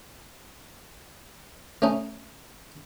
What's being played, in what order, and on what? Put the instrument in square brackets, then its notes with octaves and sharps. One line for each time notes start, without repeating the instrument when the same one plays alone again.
[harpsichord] A3 C#4 D#4